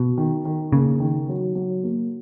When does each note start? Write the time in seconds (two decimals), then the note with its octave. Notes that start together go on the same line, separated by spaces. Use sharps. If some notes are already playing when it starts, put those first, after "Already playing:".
Already playing: B2
0.18 D#3
0.45 D#3
0.73 C#3 A#3
1.00 D#3
1.29 F#3
1.55 F#3
1.83 A#3